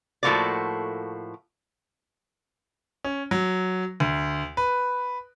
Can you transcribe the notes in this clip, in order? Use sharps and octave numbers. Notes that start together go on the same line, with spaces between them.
A2 F3 A3 A#3 F#4 D5
C#4
F#3
D2
B4